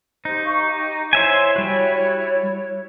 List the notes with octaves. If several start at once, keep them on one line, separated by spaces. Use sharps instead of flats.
D#4 G4 C5
F5 C#6
G4
E4 C5 C#5 E5 G#5
G3 F#4